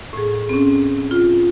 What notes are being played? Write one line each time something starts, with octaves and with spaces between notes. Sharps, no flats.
A2 G#4
C4 C#4
F4